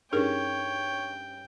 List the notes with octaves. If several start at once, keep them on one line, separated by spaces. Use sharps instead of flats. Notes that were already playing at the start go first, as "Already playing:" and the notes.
G2 C#4 D#4 G#4 A#4 C#5 G5